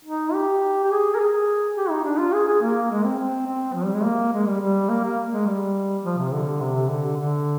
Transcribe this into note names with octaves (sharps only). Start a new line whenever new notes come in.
D#4
G4
G4
G#4
A#4
G#4
G4
D#4
D4
F4
G#4
G#4
A#3
G#3
C4
C4
C4
F3
G3
G#3
A#3
G#3
G3
G3
A#3
A#3
G#3
G3
F3
C3
D3
C3
D3
D3